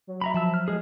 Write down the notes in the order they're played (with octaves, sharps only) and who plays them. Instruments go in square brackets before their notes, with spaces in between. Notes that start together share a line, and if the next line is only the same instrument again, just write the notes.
[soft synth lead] F#3
[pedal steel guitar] E5 A#5 B5
[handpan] F3 [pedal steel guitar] E5 A5 E6
[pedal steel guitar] F6
G#3 G#4